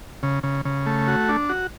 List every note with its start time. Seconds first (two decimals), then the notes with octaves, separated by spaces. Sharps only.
0.23 C#3
0.43 C#3
0.65 C#3
0.86 A3
1.08 F#4
1.29 D4
1.49 F#4